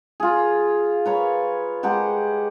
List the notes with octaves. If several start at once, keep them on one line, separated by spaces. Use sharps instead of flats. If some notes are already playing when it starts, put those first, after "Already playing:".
F4 G#4
B4 C#5 A#5
G#3 G4 F#5 A#5